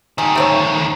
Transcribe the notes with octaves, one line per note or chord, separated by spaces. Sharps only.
D2 D#3 G4 G#4
A3 C4 C#5